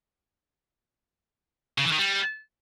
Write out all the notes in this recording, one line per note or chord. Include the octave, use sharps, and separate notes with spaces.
C#3
E3
D#3
G3